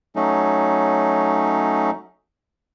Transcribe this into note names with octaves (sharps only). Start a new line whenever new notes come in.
F#3 A3 C#4 D#4